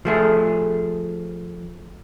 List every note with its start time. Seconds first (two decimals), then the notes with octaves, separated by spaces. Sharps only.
0.05 F3 A3 G#4